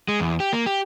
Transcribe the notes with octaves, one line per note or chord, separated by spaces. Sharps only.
G#3
E2
G4
A#3
G4